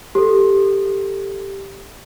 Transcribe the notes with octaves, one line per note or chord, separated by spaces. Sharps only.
G4 A4